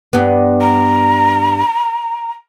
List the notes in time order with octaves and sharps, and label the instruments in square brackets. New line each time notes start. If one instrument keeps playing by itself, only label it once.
[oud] G2 B3
[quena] A#5